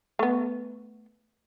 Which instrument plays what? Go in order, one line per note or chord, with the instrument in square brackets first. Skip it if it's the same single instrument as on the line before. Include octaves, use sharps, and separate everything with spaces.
[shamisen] A3 B3